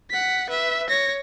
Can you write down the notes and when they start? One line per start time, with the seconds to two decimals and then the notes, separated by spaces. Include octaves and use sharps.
0.10 F#5 B6
0.49 B4 E5
0.89 C#5 A#6